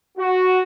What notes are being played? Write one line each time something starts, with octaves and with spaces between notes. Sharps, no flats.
F#4